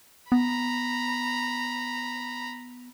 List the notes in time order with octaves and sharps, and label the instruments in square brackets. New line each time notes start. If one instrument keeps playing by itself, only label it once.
[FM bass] B3 [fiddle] A#5 B5